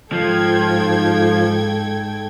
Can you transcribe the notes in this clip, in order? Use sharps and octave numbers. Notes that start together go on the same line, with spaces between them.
G#2 F3 A4 G5 G#6